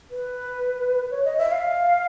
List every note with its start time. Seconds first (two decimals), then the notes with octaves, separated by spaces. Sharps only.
0.11 B4
1.11 C#5
1.25 D#5
1.38 E5
1.52 F5